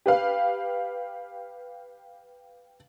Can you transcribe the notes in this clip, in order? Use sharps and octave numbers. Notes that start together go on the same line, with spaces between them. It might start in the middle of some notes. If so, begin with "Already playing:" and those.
G4 B4 F5